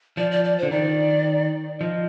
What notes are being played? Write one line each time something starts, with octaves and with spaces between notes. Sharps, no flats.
F3 D5
D5
D5
D3 C5
D#3 D5
F3 D#5